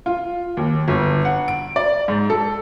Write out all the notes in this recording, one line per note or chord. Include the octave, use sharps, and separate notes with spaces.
F4
D#2
G1
F#5
D7
D5
G#2
A4